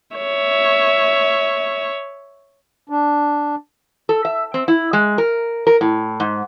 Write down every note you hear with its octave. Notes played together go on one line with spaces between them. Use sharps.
C#5 E5
D4
A4
E5
C4
E4
G#3
A#4
A#4
A2
G#2